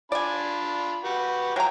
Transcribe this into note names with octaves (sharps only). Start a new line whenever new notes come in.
D4 F4 D5 G#5 B5
F#4 G4 B4
F#3 F5 G5 G#5 A#5